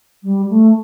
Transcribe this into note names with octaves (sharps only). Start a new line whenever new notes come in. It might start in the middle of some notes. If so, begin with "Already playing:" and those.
G3
A3